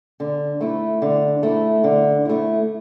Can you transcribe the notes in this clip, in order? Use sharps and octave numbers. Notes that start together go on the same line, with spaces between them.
D3
A3 E4
D3
A3 E4
D3
A3 E4